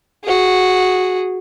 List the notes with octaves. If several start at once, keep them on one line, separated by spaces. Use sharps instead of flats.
F#4 G#4